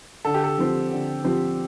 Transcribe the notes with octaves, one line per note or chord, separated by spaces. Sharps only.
D3 A4
G4
A4
F3 C4 G4
D3
F3 C4 G4